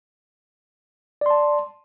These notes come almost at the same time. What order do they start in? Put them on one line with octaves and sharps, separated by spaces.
D5 C6 A5